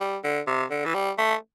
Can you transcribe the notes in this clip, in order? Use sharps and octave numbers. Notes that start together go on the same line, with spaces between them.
G3
D3
C3
D3
E3
G3
A3